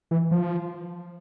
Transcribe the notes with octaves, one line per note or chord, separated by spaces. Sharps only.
E3
F3